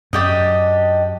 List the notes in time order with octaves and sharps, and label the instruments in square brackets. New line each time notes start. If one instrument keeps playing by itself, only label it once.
[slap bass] F#2 [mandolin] D4 G4 D#5